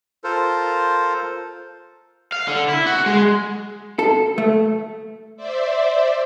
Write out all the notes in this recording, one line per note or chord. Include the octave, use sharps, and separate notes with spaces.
F4 A4 A#4 C5
F5
D3
E4
F#4
G#3
A4
A3
C5 D5 E5